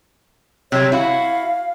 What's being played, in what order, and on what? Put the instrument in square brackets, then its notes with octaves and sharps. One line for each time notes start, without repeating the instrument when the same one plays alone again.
[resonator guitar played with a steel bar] C3 F#3 G3 [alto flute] C#5
[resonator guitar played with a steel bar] E4 F#4 [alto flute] F5